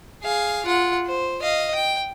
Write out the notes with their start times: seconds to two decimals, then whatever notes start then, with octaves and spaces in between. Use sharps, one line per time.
0.23 G#4 F5
0.66 F4 F#5
1.07 C5
1.42 D#5 F5
1.75 G5